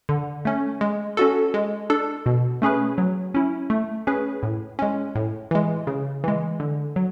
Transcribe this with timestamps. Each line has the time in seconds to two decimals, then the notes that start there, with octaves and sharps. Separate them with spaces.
0.09 D3
0.45 A3 C#4
0.81 G#3
1.17 C#4 F#4 A4
1.54 G#3
1.90 D4 A4
2.26 B2
2.62 A3 C#4 G#4 B4
2.98 F#3
3.34 C#4 E4
3.70 A3
4.07 C#4 G#4 B4
4.43 A2
4.79 G#3 C#4
5.15 A2
5.51 E3 G#3
5.87 C#3
6.24 E3 G#3
6.60 D3
6.96 F#3